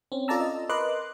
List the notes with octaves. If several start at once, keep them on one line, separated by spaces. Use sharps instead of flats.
C4 C#4
F4 A4 D5 A5 A#5 E6
D#5
A#4 B4 D#5 C6 D6 F#6